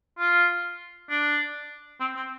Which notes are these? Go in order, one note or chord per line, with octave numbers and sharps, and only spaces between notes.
F4
D4
C4
C4